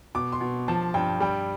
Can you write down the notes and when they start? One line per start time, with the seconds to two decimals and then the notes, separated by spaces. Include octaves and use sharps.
0.15 B2 D6
0.32 C6
0.41 B2
0.68 F3 A5
0.94 G2 G5
1.20 G3 G5